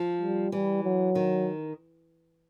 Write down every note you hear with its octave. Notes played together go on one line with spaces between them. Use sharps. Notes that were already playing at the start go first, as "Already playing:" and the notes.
Already playing: F3
G3
E3 G3
F#3
D#3